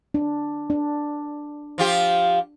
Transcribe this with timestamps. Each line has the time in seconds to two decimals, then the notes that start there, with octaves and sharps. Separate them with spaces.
0.14 D4
0.70 D4
1.78 F3 F4 G4